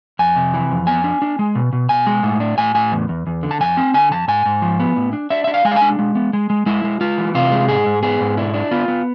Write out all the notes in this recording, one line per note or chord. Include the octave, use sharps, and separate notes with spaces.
F2 G#5
C3
E3
F2
B3 G#5
D4
D4
G#3
B2
B2
B2 G#5
G#3
A2
D4
A2 G#5
A2 G#5
E2
E2
E2
D3
A5
F2 G#5
C4
D3 G#5
F2 A5
G#2 G#5
G#2
F3
B3
A2
D4
D4 E5
D4 E5
F5
G#3 G#5
F5
G#5
D4
G#3
B3
G#3
G#3
G#3 E4
G#3
G#3 F4
E3
C3 F4
G#3
G#2 G#4
G#2
B3 G#4
G#2
D4 E4
D4
B3 F4
B3